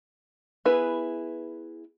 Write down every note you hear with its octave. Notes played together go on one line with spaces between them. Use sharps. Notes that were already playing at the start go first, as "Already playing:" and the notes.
B3 E4 G#4 B4